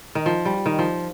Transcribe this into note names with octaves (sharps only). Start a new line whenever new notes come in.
D#3
F3
G3
D#3
F3